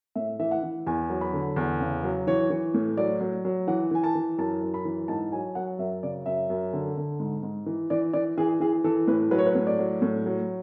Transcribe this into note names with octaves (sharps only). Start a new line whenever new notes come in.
A2 E5
E3 E5
F#5
E3
E2 G#5
F#3
B5
D3
E2
C#3
F#3
E3 C#5
E3
A2
F#3 D5
F#3
F#3
E3 F#5
E3 G#5
A5
E3
F#2 A5
F#2
B5
E3
G#2 A5
F#3 G#5
F#3 F#5
F#2 E5
C#3 D5
F#2 E5
F#2
D3
D3
G#2
G#2
E3
E3 D5
E3 D5
E3 G#4
E3 G#4
E3 A4
A2 B4
F#3 B4
C#5
B4
A2
D5
F#3
A2
F#3